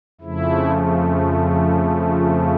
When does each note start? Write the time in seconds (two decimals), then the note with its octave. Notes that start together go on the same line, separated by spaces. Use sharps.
0.21 F2 C#3 F3 A3 E4
1.90 F4
2.17 F4